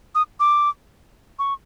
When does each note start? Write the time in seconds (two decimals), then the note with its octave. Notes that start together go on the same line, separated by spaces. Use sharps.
0.15 D#6
0.40 D6
1.39 C#6